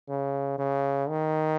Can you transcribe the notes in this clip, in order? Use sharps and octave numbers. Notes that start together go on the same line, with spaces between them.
C#3
C#3
D#3